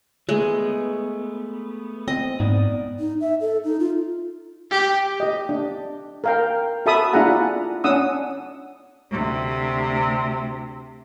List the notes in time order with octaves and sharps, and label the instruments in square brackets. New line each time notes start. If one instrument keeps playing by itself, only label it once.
[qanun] G#3 [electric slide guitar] A3 B3
[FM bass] C4 [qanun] D#5
[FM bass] G#2 [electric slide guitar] B3 D5
[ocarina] D#4
E5
A4
D#4
F4
[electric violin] G4
[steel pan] G4 D#5
D4
A#4 F5 G5
F#4 A4 E5 A5 B5 D#6
D4 E4 F4 G#4 F#5 A#5
C#4 D4 F#5 D#6 E6
[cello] D2 C3